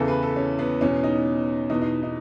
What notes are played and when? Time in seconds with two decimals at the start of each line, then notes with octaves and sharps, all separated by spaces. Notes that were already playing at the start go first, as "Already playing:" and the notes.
Already playing: E2 C#3 E3 A4
0.08 B4
0.23 A4
0.36 C#4
0.59 B3
0.81 E2 B2 C#4
1.04 D#4
1.70 E2 B2 D#4
1.81 D#4
2.03 D#4